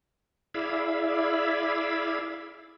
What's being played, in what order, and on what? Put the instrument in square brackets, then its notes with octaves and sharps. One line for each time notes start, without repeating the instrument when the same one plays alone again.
[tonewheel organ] E4 G#4 D5 E5 F5 B5